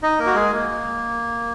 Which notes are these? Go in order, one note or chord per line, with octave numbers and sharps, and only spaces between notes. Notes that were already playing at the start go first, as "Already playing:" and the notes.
D#4 D#5
A#3 A#4
F#4
G#3 G#4
A#3